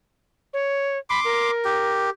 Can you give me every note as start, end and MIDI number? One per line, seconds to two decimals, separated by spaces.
0.53 0.98 73
1.10 1.20 83
1.10 1.51 84
1.10 1.51 86
1.25 2.10 70
1.65 2.10 67